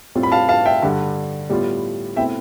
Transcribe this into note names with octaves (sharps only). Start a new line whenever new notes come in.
A2 G3 C4 F4
B5
F5 A5
F5 A5
E5 G5
G2 D3 G3
A2 G3 B3 F4
B2 A3 C4 E4 E5 G5